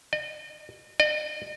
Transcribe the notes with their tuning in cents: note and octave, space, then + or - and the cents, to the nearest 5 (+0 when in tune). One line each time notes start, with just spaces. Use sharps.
D#5 -35
D#5 -40